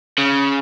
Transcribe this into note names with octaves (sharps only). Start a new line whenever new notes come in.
C#3